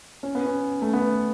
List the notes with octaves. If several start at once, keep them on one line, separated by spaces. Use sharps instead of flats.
C#4
B3
C#4
A3
B3